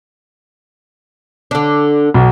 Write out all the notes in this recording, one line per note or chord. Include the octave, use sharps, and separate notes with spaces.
D3 D4
B1